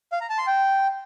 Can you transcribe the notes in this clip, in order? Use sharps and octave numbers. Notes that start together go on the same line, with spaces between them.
F5
A#5
A5
C6
G5